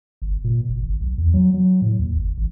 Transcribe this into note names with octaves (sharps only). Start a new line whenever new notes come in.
G1
A#2
F#1
G#1
B1
E2
F#3
F#3
A2
D#2
G1
A1